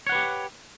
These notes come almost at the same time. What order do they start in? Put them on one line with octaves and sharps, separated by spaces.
C#5 F#5 B4 G4